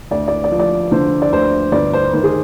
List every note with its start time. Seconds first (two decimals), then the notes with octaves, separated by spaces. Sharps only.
0.11 D2 D5
0.28 D5
0.44 D5
0.51 F3
0.60 D5
0.91 D3 C5
1.22 D5
1.33 D2 C5
1.72 G1 D5
1.93 C5
2.13 D#3 C5
2.23 G#4